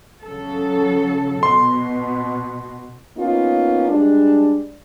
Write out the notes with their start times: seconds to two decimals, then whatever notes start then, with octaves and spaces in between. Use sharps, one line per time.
0.25 C#3 F#3 A4
1.43 B2 C6
3.17 A#3 B3 C#4 D#4 F4
3.88 G3 G#3 D4